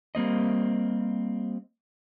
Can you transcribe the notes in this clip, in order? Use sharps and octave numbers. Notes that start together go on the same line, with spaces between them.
G3 A#3 C4 D#5